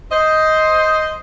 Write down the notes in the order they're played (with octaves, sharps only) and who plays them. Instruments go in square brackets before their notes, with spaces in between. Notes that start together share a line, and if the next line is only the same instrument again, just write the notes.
[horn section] C5 D#5